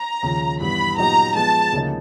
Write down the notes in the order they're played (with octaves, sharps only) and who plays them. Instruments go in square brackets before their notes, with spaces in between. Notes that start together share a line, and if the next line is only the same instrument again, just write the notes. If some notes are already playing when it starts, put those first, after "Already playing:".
Already playing: [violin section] A#5
[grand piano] D#2 C#3 F3
[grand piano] G2 E3 G3 B3 [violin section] B5
[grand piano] A#2 F#3 B3 D#4 G4 [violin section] A#5
[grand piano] F3 G#3 B3 [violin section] A5
[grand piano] D2 C#3 F3 A#3 D#4